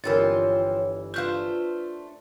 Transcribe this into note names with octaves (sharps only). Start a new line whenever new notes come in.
G1 E3 F3 C4 F4 A#4 C#5 A6
A3 D4 F4 B4 C5 F5 F#6 G6